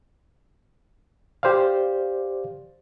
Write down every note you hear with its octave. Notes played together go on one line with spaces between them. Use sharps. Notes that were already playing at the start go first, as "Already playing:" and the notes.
G4 C5 D5 F5